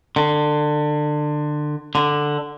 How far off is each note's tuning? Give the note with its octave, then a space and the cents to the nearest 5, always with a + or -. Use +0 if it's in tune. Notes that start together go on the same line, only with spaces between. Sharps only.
D3 +25
D3 +5